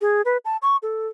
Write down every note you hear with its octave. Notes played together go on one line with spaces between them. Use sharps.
G#4
B4
A5
C#6
A4